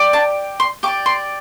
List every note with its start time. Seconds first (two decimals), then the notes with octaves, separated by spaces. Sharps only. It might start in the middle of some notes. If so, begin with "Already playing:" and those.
Already playing: G4 D5
0.13 A5
0.60 C6
0.83 G4 D6
0.88 D5
1.06 C6